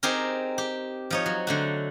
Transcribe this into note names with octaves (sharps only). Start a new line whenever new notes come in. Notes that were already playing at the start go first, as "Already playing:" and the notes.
C4 D#4 G4 G#4 A#4
G4
F3 D#4 C#5
F#3
D3 A3 F#4